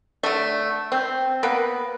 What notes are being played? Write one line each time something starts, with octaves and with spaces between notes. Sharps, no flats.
D3 A3
C4
A#3 B3 B4